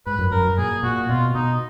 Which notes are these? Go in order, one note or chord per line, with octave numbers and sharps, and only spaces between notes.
G#2 B4
F#2
F#2 A#4
F#2
A#2 G#4
A#2 F#4
B2 F4
B2 D#4